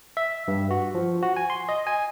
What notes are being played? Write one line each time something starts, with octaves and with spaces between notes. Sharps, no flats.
E5
G2
F#4
F3
F#4
G#5
C6
D#5
G#5